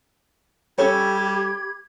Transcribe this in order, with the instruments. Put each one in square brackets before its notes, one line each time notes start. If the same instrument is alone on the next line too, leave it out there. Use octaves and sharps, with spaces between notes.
[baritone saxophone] G3 [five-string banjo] C#4 A4 C#5 [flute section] G4 B5 G#6